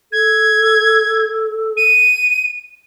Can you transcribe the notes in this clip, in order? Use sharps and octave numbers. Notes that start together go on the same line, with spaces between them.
A4 G#6
D#7